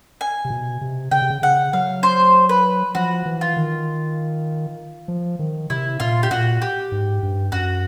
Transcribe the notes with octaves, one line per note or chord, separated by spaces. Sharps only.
G#5
C3
B2
C3
C#3 G5
C3
C#3
C#3 F#5
F#3 F5
C5
B4
F3 F#4
E3
F4
D#3
F3
D#3
C3 E4
A#2 F4
G4
A#2 F#4
G4
G#2
G2
F#2 F#4